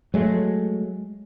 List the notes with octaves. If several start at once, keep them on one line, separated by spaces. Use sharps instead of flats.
F#3 G#3 A3